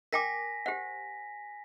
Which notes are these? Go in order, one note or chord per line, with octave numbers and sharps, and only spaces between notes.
A#4 G5 G#5 D6 A#6 B6
G4 C5 F#5